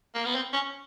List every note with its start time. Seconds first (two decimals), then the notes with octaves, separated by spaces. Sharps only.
0.15 A#3
0.25 B3
0.35 C4
0.53 C#4